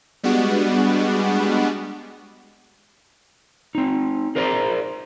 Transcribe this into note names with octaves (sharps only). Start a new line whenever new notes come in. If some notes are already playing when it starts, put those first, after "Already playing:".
G3 G#3 B3 D4 F#4
C4 D#4
G#4 A#4 C5 D5 A5 A#5